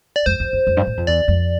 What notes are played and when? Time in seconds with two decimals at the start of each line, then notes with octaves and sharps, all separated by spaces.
0.16 D5
0.26 F2 C5
0.40 E2
0.53 F2
0.67 F2
0.77 G2
0.87 A2
0.97 F2
1.07 E2 D5
1.28 F2